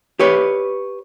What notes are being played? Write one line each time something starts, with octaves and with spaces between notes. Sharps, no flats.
G4 B4 C#5